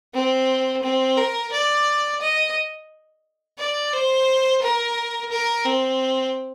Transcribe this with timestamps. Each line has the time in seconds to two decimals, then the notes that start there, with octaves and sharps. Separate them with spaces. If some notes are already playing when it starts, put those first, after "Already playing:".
0.14 C4
0.83 C4
1.17 A#4
1.52 D5
2.21 D#5
3.59 D5
3.93 C5
4.62 A#4
5.31 A#4
5.65 C4